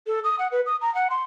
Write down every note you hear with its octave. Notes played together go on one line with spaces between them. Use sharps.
A4
D#6
F#5
B4
D#6
A#5
F#5
C6